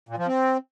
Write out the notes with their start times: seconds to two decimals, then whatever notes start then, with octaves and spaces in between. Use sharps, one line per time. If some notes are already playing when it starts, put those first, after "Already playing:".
0.09 A#2
0.18 F3
0.27 C4